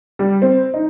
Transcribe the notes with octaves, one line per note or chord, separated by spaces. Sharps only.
G3
C4
D#4